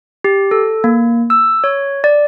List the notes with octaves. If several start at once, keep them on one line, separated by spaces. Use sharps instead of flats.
G4
A4
A#3
E6
C#5
D5